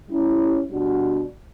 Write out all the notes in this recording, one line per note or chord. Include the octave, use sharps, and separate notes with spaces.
G3 C#4 E4
B2 G3 D4 F#4